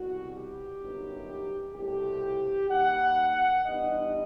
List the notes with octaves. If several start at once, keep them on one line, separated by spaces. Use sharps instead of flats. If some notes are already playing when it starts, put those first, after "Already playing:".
Already playing: C2 B2 G3 F#4
G4
G1 F#2 F#3 B3 D#4
C2 B2 A3 C4 G4
D#2 D#3 G3 F#5
G2 E3 G3 B3 D#4 D#5